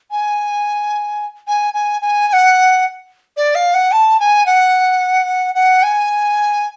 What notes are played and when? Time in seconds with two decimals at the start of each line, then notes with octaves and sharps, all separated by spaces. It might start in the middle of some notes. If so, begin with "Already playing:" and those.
0.11 G#5
1.47 G#5
1.74 G#5
2.01 G#5
2.28 G#5
2.33 F#5
3.37 D5
3.55 F5
3.74 F#5
3.92 A5
4.19 G#5
4.46 F#5
5.54 F#5
5.83 G#5